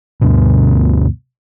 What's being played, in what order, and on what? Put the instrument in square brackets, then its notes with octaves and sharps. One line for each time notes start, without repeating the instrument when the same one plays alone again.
[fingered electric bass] D2 G2 B2